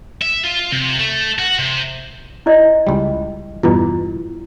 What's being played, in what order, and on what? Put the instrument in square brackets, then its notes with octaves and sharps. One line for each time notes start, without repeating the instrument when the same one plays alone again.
[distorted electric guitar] E5
F4
C3
A3
F#4
C3
[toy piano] E4 D5 D#5
[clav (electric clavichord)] C#2 G3
[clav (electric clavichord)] E2 G2 B2 [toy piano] E4 F4